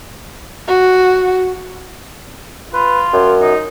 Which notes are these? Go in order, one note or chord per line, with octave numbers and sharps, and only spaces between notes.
F#4
F4 B4
F#2
D#4